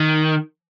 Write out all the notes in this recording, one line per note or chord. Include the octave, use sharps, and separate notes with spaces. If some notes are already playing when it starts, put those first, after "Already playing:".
Already playing: D#3